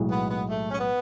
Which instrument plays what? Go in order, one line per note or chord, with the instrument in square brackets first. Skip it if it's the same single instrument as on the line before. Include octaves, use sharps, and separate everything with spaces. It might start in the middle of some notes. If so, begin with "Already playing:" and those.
Already playing: [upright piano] B1 A2 G#3
[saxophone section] B3
B3
A3
C#4
B3